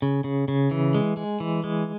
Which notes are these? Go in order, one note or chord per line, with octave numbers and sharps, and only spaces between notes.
C#3
C#3
C#3
E3
G#3
G#3
E3
G#3